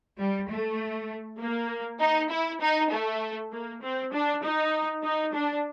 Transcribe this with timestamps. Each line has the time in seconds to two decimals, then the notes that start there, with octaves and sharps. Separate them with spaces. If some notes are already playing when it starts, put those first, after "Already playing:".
0.18 G3
0.49 A3
1.39 A#3
2.00 D#4
2.30 E4
2.60 D#4
2.91 A3
3.51 A#3
3.82 C4
4.12 D4
4.42 D#4
5.03 D#4
5.33 D4